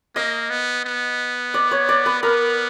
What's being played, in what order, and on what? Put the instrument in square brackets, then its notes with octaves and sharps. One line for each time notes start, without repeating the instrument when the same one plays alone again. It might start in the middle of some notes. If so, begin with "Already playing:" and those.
[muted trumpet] A#3 [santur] D#5
[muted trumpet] B3
B3
[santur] D5
C#5
D5
B4
[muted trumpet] B3 [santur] A#4